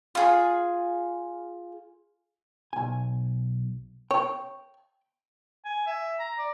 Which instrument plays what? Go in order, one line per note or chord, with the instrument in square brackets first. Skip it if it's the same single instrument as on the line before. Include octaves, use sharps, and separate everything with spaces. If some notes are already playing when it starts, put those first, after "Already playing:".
[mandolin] F4 G#4
[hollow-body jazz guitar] B1 G#5
[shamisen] C#5 [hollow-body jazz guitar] G5
[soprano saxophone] G#5
E5
A#5
D5